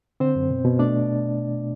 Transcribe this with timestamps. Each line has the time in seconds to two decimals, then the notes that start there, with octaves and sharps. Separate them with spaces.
0.20 D3 C4 C5
0.36 F#2
0.49 B2
0.65 B2
0.79 A3 D4 D5